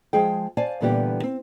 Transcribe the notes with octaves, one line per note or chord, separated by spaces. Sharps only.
F3 G#3 G#4 G5
C5 D5 F5 G#5 A5
A#2 D3 E3 G3 B3 G4
C4